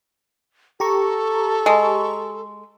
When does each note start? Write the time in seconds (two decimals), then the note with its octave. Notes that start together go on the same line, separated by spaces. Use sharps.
0.80 G4 A4 A#5 C#6
1.66 G#3